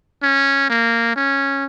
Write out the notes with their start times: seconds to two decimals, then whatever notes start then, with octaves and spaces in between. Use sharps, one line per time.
0.23 C#4
0.70 A#3
1.16 C#4